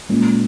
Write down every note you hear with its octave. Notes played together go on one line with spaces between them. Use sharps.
A#2 G#3 C#4